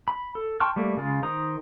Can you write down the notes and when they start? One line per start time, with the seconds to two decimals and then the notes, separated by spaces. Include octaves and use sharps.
0.08 B5
0.35 A4
0.60 G5 A5 C6 C#6 F6
0.76 G3 A3 A#3
0.97 C#3 G#3 F4
1.23 D#3 C5 A#5 D#6